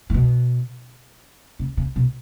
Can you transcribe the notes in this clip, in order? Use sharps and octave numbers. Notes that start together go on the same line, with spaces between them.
A2
B2
C#3
C#3
B2